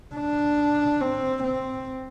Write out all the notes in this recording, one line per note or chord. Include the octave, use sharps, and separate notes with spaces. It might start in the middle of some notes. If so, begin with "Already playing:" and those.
D4
C4
C4